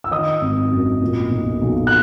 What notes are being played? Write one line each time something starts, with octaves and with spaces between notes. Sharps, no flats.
E6
D#3 D#5 D#6
G#1
F#2
A#2
B1
B1
F#6